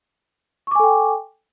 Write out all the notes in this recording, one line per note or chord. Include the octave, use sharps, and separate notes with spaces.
A4 G5 G#5 C#6 D6